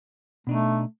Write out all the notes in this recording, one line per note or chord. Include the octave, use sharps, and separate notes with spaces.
B2 A3 D4 D#4